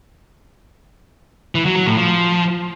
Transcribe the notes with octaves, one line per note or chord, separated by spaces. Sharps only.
E3
F#3
F#3
A2
F3